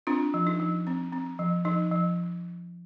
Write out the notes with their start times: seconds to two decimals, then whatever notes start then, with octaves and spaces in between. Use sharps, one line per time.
0.07 C4 D4 F4
0.34 F3
0.47 D#4
0.60 F3
0.87 C4
1.13 C4
1.39 F3
1.65 F3 D#4
1.92 F3